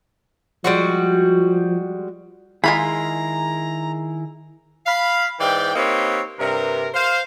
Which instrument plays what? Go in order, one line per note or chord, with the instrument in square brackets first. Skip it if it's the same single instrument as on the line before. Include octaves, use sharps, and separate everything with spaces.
[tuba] F3 [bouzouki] G3 G#3 F#4
[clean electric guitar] D#3 E4 G#4 [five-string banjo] G#3 F4 B5 [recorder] A#5
[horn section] F5 B5
G#2 E3 D5 G5
A#3 C4 D#4 G4 B4 C#5
G2 C3 A#4
C5 F5